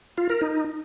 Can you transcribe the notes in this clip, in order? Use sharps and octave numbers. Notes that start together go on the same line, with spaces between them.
F4
A#4
D#4